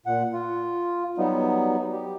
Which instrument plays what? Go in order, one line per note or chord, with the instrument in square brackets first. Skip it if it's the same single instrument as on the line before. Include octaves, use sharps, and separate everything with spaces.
[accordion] A#2 F#5
F4
F#3 G3 B3 D#4
G4